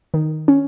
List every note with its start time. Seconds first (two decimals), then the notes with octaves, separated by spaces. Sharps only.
0.14 D#3
0.48 C#4